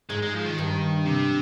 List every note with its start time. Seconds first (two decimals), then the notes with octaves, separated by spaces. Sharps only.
0.10 G#2 G#3
0.23 G#3
0.34 F3
0.46 D#3
0.58 G2
1.05 C3